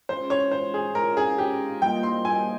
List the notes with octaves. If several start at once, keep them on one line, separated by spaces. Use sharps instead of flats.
G#3 C#4 F4 C5
C#5
C5
G#4
G#3 C#4 F4 A#4
G#4
G4
G3 A#3 F4 C5 D#5 G5
C6
G#5